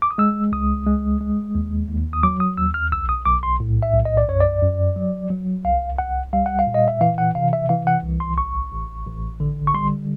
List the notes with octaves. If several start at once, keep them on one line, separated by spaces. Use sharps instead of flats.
D6
D#6
G#3 E6
C#2 D#6
G#3
G#3
D#2
D#2
D#6
F#3 D6
D#6
D#2 E6
F6
B1 E6
D#6
B1 D6
C6
A2
E5
B1
D#5
D5
F#2 C#5
D5
F#2
F#3
F#3
C2 F5
C2 F#5
G3 F5
F#5
F5
A#2
D#5
E5
E3 F5
F#5
C3 F5
E5
E3 F5
F#5
C2
C6
A1 C#6
A1
A1
D3
C#6
G3 C6